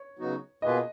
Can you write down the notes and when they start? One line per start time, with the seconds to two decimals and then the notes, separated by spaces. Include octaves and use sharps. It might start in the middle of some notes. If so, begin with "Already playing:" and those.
Already playing: C#5
0.19 C#3 F#3 B3 D#4 F#4
0.62 B2 A#3 F4 G#4 B4 D#5